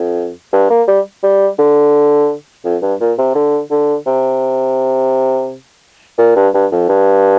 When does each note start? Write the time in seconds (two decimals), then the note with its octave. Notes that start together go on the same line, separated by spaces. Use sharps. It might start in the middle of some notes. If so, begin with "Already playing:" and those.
Already playing: F2
0.53 G2
0.70 A#3
0.88 G3
1.23 G3
1.59 D3
2.65 F2
2.83 G2
3.01 A#2
3.18 C3
3.35 D3
3.71 D3
4.06 C3
6.19 A#2
6.36 G2
6.54 G2
6.72 F2
6.89 G2